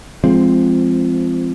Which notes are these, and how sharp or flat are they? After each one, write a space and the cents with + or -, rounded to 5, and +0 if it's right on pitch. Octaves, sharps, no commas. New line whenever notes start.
F3 -20 G#3 +0 C4 +0